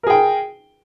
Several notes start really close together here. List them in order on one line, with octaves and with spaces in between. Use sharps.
A#4 G#4 G5